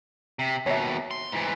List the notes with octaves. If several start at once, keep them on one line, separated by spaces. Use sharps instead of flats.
C3
D#2 B2 C#5 E5
C6
G#2 E3